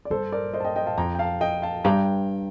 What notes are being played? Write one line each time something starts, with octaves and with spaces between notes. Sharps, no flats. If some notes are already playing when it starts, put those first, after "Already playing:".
D5
G2 A4 C5
A#4 D5
C5 D#5
A5
D#5 G5
D#5 G5
F5 A5
F2 G5 A#5
G5
F5 A5
D#5 G5
F5 A5
G2 G5 A#5